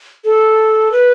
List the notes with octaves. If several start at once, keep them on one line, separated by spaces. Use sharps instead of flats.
A4
B4